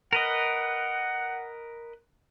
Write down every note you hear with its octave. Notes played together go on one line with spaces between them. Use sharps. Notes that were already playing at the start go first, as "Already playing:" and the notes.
A#4 B4 D#5 F#5